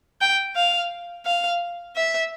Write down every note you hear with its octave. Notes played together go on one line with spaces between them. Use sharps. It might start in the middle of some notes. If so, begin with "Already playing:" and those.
G5
F5
F5
E5